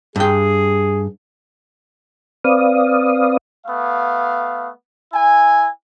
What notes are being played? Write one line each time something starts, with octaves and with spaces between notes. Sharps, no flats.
G2 G#4 G5
C4 B4 D5 F5 D#6
A3 B3 F5
E4 G#5